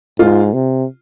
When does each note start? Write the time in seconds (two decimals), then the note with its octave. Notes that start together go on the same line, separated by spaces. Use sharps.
0.19 G#2 F4
0.54 C3